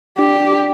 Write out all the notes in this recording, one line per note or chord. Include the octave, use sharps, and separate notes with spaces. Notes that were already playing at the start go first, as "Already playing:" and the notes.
D4 G4